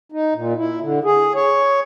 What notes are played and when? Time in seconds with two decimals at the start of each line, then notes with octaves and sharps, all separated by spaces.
0.12 D#4
0.35 A#2
0.57 E4
0.81 D3
1.04 G#4
1.35 C#5